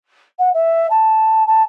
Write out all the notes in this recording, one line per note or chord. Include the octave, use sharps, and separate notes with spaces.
F#5
E5
A5
A5